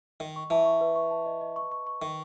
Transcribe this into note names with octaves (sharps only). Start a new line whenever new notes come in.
D#3 D#5
C#6
E3 A5
C#6
B4
C#6
A5
D#5
D#5
C#6
C#6
C#6
D#3 C#6